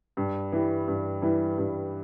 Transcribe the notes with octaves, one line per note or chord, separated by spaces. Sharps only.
G2
E3 G3
G2
E3 G3
G2